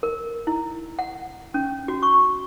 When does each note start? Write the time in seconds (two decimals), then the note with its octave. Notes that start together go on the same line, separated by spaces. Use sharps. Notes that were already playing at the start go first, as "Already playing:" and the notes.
0.03 A#4
0.47 E4
0.99 F#5
1.54 C#4
1.88 F#4
2.03 C#6